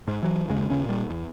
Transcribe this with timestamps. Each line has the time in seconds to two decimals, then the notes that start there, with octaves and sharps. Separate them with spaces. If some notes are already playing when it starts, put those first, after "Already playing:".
0.08 G#2
0.23 E3 F#3
0.48 F#1 D#2 C#3 G#3
0.70 D#2 C#3 C#4
0.85 A#2 G3
1.10 E2